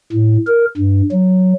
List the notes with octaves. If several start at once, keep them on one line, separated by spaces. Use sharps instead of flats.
A2
A#4
G2
F#3